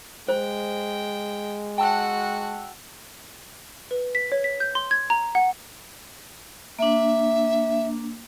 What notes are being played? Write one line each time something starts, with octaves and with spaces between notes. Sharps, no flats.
G#3 C5 G5
F#4 F#5 G5 A5 E6
B4
B6
C#5
B6
G6
C6
G#6
A#5
F#5
A#3 D4 E5